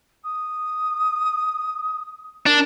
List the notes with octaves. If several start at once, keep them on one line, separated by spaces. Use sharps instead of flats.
D#6
D4 A#4